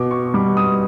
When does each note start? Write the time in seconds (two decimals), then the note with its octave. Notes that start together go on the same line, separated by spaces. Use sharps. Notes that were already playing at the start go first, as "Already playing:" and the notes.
Already playing: B2 D6
0.11 C#6
0.34 G3 D6
0.57 D#6